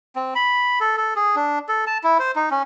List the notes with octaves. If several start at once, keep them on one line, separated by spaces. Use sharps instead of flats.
C4
B5
A4
A4
G#4
D4
A4
A5
E4
C5
D#4
C#4